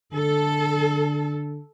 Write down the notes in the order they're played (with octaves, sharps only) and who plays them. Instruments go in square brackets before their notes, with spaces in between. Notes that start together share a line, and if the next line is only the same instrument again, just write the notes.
[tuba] D3 [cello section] A4